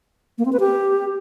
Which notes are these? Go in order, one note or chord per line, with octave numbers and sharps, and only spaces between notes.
A#3
C4
B4
G4